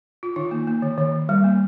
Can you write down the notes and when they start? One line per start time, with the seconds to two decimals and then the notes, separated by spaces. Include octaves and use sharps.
0.23 F4
0.36 D#3 D#4
0.51 A#3
0.67 A#3
0.82 D#3
0.98 D#3
1.29 G3
1.44 A#3